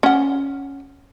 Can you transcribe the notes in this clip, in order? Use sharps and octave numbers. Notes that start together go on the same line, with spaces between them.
C#4 F#5